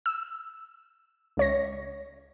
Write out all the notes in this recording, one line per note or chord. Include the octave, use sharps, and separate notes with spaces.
E6
C#2 C#5 A#6